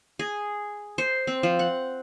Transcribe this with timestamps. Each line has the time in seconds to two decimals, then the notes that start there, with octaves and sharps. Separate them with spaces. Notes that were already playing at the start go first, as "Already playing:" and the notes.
0.19 G#4
0.98 C5
1.27 C4
1.43 F3
1.59 F#5